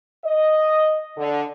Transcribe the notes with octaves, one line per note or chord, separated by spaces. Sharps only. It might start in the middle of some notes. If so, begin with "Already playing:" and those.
D#5
D3